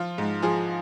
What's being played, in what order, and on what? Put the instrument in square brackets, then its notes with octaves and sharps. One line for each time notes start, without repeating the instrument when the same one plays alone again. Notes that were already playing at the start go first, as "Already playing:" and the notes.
Already playing: [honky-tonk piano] F3 F4
G#2
F3 G#4